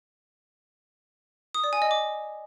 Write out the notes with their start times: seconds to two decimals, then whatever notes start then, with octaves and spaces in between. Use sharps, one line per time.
1.55 D#6
1.64 D5
1.73 G#5
1.82 D#5
1.91 D6